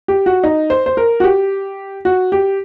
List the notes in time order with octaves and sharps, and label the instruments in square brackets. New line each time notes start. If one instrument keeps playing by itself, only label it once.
[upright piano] G4
F#4
D#4
C5
C5
A#4
F#4
G4
F#4
G4